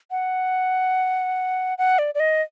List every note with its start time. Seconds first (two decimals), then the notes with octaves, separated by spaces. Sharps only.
0.11 F#5
1.78 F#5
1.99 D5
2.15 D5
2.20 D#5